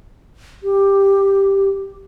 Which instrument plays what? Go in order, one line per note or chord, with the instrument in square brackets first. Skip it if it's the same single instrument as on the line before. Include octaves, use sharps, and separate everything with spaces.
[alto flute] G4